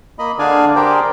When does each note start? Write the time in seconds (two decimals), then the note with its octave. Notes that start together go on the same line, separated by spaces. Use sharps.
0.19 A#3 D#5 B5
0.39 D3 D4 G#4 D5 F5 G#5
0.75 G4 G#4 A#4 C5 D5 G5